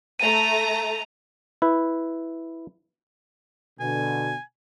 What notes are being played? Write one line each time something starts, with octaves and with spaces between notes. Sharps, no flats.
A3 A#5 D#7 F7
E4 B4
B2 D3 G#5